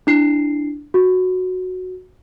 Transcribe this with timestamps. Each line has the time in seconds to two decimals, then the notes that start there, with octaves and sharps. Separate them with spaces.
0.07 D4 E4 C7
0.94 F#4